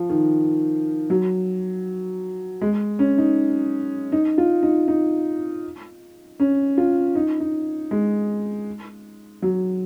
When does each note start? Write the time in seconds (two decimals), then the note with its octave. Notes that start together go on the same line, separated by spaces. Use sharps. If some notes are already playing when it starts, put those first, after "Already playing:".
Already playing: F3
0.09 D#3
1.10 F#3
2.61 G#3
2.99 C#4
3.18 D#4
4.12 D#4
4.38 F4
4.63 D#4
4.88 D#4
6.40 C#4
6.78 F4
7.15 D#4
7.40 D#4
7.91 G#3
9.42 F#3